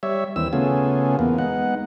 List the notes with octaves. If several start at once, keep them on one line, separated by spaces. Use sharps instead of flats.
G3 C#5 E5
D#2 E3 C4 E6
C#3 A3 B3 C#4 F4 G#4
E2 A#3 B3
G#3 B3 D#4 F#5